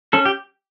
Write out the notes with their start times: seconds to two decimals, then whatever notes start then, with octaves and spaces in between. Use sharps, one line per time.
0.13 C#4 A4
0.26 G4